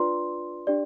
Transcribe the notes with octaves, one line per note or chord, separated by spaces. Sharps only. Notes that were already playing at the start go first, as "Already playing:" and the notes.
Already playing: D4 F4 B4 D5 C6
D4 G4 D5